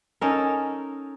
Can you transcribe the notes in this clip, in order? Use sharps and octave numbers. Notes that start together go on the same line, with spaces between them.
C#4 D#4 A4 A#4